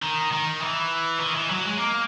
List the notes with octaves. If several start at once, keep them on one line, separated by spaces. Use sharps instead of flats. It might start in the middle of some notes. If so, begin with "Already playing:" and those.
D#3
D#3
E3
D#3
E3
F#3
G#3
A#3